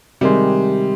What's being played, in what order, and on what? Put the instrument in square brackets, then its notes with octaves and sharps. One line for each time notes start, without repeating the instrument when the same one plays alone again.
[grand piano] C3 D#3 G#3 [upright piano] G3